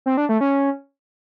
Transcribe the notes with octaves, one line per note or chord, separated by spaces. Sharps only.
C4
D4
A3
C#4